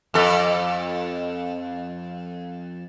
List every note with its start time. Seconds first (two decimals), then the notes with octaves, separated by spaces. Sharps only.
0.14 F2 A4